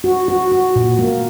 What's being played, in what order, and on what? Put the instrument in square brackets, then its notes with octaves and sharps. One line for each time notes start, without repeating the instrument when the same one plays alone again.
[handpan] F#4
F#4
F#4
A#2
A#3